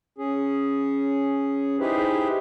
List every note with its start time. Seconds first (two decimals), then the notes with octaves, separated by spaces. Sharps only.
0.18 C#4 G#4
1.80 D#4 E4 G4 G#4 B4 C5